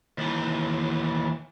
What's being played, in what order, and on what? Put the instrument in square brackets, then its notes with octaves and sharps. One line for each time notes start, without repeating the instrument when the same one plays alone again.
[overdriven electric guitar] D#2 E3